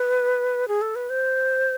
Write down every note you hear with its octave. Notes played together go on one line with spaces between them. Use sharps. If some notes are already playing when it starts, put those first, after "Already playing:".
Already playing: B4
G#4
A4
B4
C5